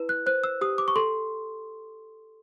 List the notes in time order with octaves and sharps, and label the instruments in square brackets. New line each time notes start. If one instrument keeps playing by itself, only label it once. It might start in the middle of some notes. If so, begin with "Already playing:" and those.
Already playing: [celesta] E4 B4
F#6
C5 F#6
E6
G4 D#6
D6
C#6
A4 C6